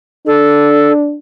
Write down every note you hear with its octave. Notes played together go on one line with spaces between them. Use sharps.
D4 A4